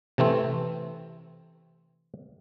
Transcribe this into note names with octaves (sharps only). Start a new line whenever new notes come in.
C3 E3 A3 C4